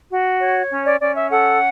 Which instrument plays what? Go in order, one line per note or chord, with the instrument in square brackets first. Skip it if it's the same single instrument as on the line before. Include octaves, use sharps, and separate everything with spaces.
[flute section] F#4
C#5
C#4
D5
C#4 D5
E5
A4 F#5